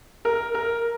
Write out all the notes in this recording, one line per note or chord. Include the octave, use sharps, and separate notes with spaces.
A#4
A#4